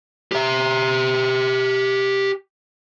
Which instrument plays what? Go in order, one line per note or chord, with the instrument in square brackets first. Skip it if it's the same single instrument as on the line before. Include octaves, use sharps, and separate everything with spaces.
[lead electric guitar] G4 E5